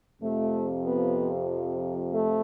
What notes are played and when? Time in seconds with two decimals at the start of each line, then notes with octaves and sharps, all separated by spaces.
0.22 F2 C3 F3 A3
0.85 B3
2.13 A3